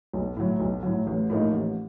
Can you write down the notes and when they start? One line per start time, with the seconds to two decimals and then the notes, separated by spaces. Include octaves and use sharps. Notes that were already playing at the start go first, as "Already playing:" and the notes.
0.14 B1
0.37 A2 F#3
0.60 B1
0.83 A2 F#3
1.07 A1
1.30 A2 F3 A#3 D#4
1.53 A1